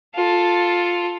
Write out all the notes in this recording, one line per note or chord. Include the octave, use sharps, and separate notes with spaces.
F4 A4